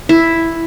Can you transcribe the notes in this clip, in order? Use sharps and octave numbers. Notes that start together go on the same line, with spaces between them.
E4